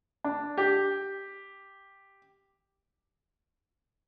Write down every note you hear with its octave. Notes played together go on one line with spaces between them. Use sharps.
D4
G4